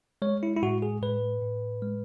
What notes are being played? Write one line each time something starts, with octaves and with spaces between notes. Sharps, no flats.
G#3 C#5
E4
E4
A2 F#4
G#4
A2 B4
A2
G#3